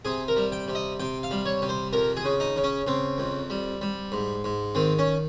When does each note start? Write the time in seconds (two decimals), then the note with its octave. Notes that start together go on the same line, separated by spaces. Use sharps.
0.05 C3 G#4
0.28 A#4
0.37 G3
0.52 G5
0.68 C3
0.75 D#5
1.00 C3 G5
1.23 F5
1.31 G3
1.46 C#5
1.62 C3
1.69 C5
1.93 F2 A#4
2.17 G#4
2.25 C#3
2.40 D#4
2.56 C#3
2.64 C#4
2.87 C#3 C4
3.18 F2
3.50 G3
3.81 G3
4.12 G#2
4.44 G#2
4.75 D#3 C4
4.99 C#4